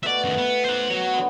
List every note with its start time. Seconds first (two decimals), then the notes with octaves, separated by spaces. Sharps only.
0.03 B2 A3 D5 E5 F#5
0.25 F#2 D#3
0.38 B3
0.65 C5 F#5
0.90 F#3 F#4 C#5
1.14 D3 B3